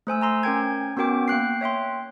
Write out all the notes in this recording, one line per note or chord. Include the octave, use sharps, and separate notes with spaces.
A3 C5 G#5 E6
G#5 A#5 C6 E6
C#4 A#4 G5 G#6
B3 C#4 F#4 A#4 G5 D6
A#3 G5 F#6 C7
C#5 E5 G5 C6